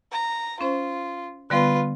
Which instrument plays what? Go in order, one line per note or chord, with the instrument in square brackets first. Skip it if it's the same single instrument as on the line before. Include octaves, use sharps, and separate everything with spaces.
[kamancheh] A#5
[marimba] C#4 C5 [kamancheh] F4
[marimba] D3 G3 B3 [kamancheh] F4 B4